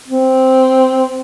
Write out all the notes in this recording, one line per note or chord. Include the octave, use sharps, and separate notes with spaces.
C4